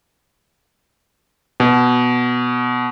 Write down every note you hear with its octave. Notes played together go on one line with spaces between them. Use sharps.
B2